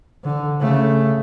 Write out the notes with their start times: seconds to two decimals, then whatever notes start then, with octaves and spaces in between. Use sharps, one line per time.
0.24 D3
0.60 C#3 A3